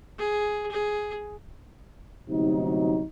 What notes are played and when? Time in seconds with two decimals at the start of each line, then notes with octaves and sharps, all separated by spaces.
0.19 G#4
0.72 G#4
2.30 G1 D2 C3 F#3 D#4